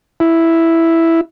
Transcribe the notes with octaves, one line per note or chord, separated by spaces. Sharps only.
E4